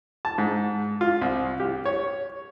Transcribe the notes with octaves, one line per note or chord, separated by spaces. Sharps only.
A5
G#2
F4
C2
G4
C#5